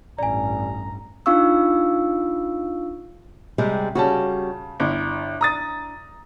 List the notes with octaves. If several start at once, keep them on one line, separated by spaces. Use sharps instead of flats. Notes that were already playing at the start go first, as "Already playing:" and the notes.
A1 G2 D5 G#5 A#5
D4 D#4 F4 F5 C#6 E6
C3 G3 G#3
C#3 G3 C#4 F#4 A5
G1 D4 E4
A#5 D#6 A6